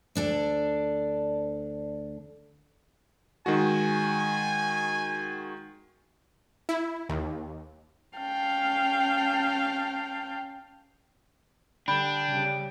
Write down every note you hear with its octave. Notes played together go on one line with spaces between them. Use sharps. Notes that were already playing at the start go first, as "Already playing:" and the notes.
D2 D4 A4
D#3 G#3 F#4 G#5
E4
D#2
C#4 F5 G5 A5
D3 G3 D4 G5 B5
C#3 G3